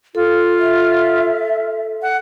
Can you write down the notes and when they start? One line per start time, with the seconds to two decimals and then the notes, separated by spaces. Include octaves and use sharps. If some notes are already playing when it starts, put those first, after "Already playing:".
0.15 F4 A4
0.59 E5
2.02 F#5